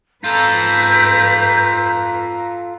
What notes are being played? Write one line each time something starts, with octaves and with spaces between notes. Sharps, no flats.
G#2 F4 A4 B4 A#5 G6